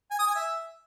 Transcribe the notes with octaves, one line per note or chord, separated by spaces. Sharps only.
G#5
D#6
G#5
E5